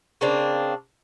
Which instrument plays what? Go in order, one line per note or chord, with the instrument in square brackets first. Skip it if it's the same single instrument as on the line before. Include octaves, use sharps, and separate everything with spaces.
[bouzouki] C#3 A#3 C4 D4